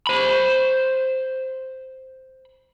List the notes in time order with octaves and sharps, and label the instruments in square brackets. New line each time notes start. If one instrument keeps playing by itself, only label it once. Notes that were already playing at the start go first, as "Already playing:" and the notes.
[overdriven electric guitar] C5 B5